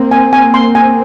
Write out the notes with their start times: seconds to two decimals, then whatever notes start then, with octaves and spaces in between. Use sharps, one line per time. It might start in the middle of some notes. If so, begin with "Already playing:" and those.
Already playing: A#3 C4
0.11 G#5
0.33 G#5
0.54 C6
0.75 G#5